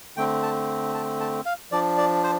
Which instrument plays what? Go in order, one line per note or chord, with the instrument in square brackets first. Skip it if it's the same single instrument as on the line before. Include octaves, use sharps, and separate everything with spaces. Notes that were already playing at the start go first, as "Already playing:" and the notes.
[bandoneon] D3 A3 C4 G5
A5
A5
A5
F5
F3 D4 D5
D5
C5